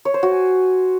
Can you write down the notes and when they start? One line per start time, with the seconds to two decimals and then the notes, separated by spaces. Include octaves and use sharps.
0.05 C#5
0.14 C5
0.23 F#4
0.31 G#5